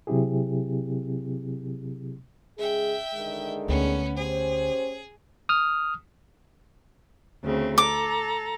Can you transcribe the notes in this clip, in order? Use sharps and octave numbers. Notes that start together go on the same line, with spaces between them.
C3 F#3 C4 E4 G4 G#4
C#3 G#3 G#4 E5 G5
D3 D#3 G#3
D2 B3 C#4
C#4 G4 G#4 C5
D#6 F6
D2 C#3 C4
A4 A#5 D6